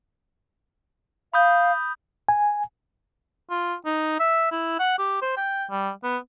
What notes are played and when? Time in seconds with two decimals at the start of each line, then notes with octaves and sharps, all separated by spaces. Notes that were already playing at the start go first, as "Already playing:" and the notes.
1.34 F5 B5 D#6 G6
2.29 G#5
3.50 F4
3.86 D#4
4.20 E5
4.52 E4
4.79 F#5
4.99 G4
5.22 C5
5.37 G5
5.70 G3
6.04 B3